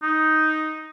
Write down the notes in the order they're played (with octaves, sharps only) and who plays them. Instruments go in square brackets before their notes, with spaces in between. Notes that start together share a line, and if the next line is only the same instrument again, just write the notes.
[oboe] D#4